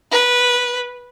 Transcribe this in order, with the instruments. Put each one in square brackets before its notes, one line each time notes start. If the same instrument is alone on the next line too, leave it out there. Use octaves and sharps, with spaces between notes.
[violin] B4